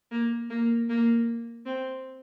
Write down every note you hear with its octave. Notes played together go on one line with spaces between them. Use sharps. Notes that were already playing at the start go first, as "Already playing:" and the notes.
A#3
A#3
A#3
C4